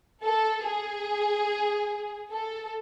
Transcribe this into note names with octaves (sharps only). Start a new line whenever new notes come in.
A4
G#4
A4